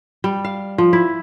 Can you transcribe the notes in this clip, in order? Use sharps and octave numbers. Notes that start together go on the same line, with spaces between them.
G3
F5
F3
E4